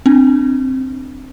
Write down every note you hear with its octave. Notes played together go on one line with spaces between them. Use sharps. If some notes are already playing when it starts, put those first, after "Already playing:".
C4 D4